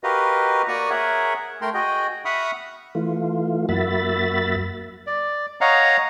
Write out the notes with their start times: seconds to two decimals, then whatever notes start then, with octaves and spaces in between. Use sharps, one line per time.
0.04 F#4 G4 A#4 B4 D#5 F5
0.68 A#3 F#4 D5 A#5 C#6 D#6
0.90 G#4 A#4 C#5 E5 F#5
1.62 A3 A#4 G5 A#5 C6
1.74 F#4 G#4 D#5 G5
2.25 E5 F#5 B5 C#6 D#6 F6
2.95 E3 A3 F4
3.69 F#2 A#3 F#4 E5 B5 A6
5.07 D5
5.61 C#5 D#5 F5 F#5 A#5